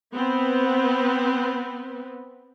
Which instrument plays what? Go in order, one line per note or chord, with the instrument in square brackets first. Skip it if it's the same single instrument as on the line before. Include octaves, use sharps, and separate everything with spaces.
[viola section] B3 C4 B4